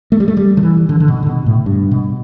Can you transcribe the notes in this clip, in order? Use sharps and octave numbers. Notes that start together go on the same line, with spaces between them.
A3
G3
A3
G3
D3
E3
D3
D3
B2
D3
B2
A2
G2
B2